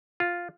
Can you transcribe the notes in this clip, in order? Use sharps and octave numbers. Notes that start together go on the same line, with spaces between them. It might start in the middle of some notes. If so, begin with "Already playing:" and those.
F4